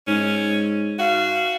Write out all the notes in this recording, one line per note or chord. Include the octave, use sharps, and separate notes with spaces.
G#2 C#4
F#4 F5